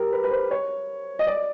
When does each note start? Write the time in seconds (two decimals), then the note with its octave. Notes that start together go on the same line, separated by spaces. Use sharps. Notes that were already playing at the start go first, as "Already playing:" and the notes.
Already playing: G4 A#4
0.13 B4
0.24 B4
0.31 C5
0.51 C#5
1.19 D#5
1.27 D5